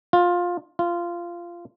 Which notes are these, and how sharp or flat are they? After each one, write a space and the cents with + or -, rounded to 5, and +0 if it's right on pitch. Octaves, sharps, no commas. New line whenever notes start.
F4 +15
F4 -15